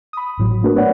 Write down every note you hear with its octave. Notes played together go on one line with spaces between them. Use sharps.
B5 D#6
G#1 A2 F#3
F#3
A3 A#3 D4 F#4 A#4 B4
A3 B3 B4 C#5 D5 F#5